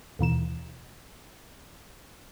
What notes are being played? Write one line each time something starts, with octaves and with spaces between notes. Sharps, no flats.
D#2 B2 E3 E7